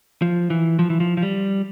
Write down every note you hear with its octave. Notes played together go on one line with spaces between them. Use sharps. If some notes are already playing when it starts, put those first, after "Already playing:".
F3
E3
F3
E3
F3
F3
G3